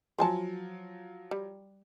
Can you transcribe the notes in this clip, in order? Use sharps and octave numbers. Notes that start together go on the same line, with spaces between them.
F3 F#3 C5 G#5 A5
G3